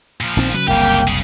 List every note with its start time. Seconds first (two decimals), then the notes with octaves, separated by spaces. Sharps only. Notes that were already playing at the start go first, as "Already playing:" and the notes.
0.21 A#2 F3
0.37 A#1 D#3 C4
0.54 C#3 F#3 B4
0.68 F#1 C2 C#3 A#3 G4 G5
1.08 C#3 G#4